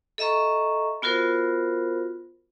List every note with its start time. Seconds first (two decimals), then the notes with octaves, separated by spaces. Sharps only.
0.18 A4 D#5 E5 A#5 C#6
1.02 B3 F4 F#4 A#4 C5